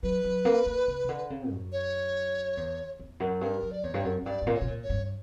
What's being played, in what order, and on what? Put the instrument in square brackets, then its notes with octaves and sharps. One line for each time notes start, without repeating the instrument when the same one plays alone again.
[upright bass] F#3 [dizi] B4
[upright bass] F#3
A#3
A#3
C#3
C#3
D3
C#3
F#2
[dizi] C#5
[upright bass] E2
E2
F#2
[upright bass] G2 [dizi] A#4
[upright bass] F#2
[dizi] D5
[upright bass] E2 [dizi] C#5
[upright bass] G2
F#2
F#2
[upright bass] G2 [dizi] D5
[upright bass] G2
A#2
[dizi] C#5
[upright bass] B2
A#2
[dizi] C#5
[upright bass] G2